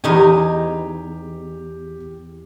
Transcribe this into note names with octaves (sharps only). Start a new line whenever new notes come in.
E2 D#4 G4 G#5